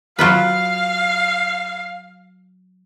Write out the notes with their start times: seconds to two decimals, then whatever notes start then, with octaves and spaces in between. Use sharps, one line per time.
0.19 F#3 F4 B4 F5